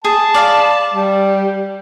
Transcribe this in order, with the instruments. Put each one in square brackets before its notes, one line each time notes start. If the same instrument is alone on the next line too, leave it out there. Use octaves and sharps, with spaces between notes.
[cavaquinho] G#4 D#6 [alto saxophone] A5
[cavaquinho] D5 F5 B5
[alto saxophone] G3